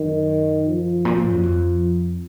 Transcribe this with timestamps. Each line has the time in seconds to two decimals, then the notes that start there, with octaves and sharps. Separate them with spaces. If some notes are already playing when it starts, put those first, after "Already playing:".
Already playing: F#2 D#3
0.67 F3
1.05 A#2
1.18 G#2
1.30 F#2
1.43 F2